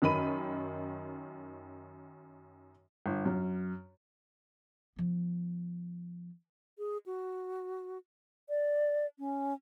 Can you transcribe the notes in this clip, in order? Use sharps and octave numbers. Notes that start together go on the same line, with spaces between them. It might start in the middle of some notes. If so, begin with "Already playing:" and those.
F#2 D#3 B5 D#7
G1
F#2
F3 B3
G#4
F#4
D5
C#4